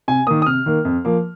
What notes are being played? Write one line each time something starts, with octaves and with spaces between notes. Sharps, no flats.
C3 G#5
D#3 A#3 D#6
D#6
C3 F6
D#3 A#3
F2
F3 A#3